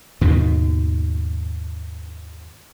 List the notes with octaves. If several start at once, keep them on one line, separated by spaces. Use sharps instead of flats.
D#2 G#2 B2